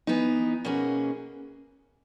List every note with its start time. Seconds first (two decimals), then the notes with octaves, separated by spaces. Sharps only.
0.07 E3 B3 D#4
0.65 B2 A#3 C#4 G#4